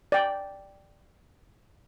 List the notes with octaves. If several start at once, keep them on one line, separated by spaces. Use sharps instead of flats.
D5 G5